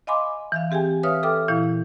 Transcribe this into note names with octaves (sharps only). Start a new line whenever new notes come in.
D#5 F5 G#5 B5 C6 D6
E3 E5 F5
C4 G4 G#4 G5 G#5
B4 C#5 E5 F5 D#6 F6
A4 B4 E5 G5 D6 F6
A#2 E3 E4 F5